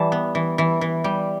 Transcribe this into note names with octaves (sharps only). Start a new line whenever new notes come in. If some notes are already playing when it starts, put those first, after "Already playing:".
Already playing: E3 G3 A5
B3
E3
E3
E3
G3